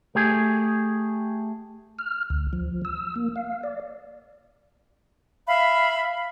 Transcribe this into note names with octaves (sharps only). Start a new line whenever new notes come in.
A3 G4 G#4
F6
D2
F3
E6
A#3
F5
D5
E5 F5 B5